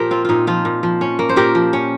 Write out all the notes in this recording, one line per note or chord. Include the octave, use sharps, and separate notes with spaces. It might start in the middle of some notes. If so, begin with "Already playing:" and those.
Already playing: A#2 F3 G4 A#4 C5
C4 F4
A#2 D#4 F4
F3 F4
A#2
F3
C#4
A#3
C5
A#2 G4 A#4
F3
C#4